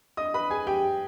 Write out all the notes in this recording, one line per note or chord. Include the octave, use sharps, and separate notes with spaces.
D#5 D#6
B4 B5
G#4 G#5
G4 G5